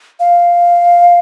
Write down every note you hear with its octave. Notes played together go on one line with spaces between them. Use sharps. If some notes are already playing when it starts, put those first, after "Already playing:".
F5